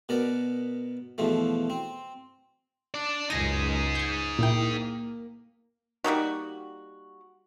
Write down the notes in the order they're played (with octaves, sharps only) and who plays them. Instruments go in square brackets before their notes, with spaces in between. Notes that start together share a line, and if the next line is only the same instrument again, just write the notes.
[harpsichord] B2 B3 A#4 D5
E2 B2 F3 A3
C4
[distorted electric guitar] D4 D5
[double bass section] C#2 F#2 [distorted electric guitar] D#4 G#4 [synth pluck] G#6 A#6 D#7
[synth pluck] G6 G#6
[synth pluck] A#2 E4 G5 [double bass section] A#3
[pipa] G3 A#3 D#4 F#4